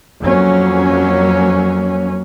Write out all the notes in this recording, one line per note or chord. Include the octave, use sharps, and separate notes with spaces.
F2 F#3 A#3 C#4